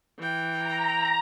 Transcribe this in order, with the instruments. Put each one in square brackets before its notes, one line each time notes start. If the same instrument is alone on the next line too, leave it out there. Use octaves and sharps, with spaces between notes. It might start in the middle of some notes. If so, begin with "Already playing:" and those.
[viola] E3 G5
[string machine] A#5